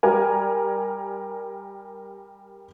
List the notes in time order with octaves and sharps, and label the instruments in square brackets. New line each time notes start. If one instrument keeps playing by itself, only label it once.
[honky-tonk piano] G3 A#4 G#5